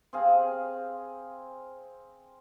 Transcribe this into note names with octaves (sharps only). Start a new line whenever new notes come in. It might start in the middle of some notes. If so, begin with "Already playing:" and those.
C4 G#4 F5